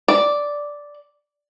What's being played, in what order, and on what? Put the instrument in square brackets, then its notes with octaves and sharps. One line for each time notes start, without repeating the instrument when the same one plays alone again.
[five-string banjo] D5